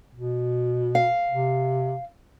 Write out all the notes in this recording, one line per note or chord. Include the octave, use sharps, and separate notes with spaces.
B2
F5
C3